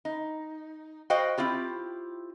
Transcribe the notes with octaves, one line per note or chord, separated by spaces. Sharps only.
D#4
F#4 C5 D#5 F5 G5
C4 E4 F4 G4